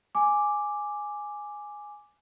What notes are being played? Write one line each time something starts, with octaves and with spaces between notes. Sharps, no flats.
G#5 D6